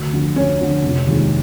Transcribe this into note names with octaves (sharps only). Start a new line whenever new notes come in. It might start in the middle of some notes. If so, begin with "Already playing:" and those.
Already playing: D2
D3 F3
D2 C#4
D3 F3
F1
D#2 D#3 G#3